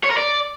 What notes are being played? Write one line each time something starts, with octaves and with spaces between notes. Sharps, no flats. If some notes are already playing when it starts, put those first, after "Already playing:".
C#5
A#4
D5